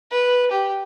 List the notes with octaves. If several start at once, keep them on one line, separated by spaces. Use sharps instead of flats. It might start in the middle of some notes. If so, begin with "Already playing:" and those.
B4
G4